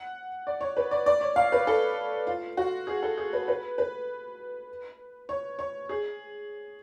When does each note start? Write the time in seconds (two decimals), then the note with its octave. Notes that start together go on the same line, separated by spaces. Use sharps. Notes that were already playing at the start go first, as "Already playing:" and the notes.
Already playing: F#5
0.47 D5
0.61 C#5
0.77 B4
0.91 D5
1.06 D5
1.21 C#5
1.36 F5
1.52 B4
1.67 A4
2.27 F4
2.57 F#4
2.87 G#4
3.03 A4
3.18 G#4
3.33 B4
3.48 B4
3.78 B4
5.29 C#5
5.59 C#5
5.89 G#4